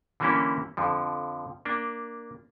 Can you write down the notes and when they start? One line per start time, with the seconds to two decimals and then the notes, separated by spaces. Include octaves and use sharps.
0.20 D3 E3 G3 A#3 C#4 E4
0.77 F2 D3 F3
1.65 A#3 D4